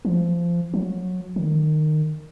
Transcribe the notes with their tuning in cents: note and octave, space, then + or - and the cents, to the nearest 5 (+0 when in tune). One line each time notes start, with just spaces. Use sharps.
F3 -20
F#3 -20
D#3 -20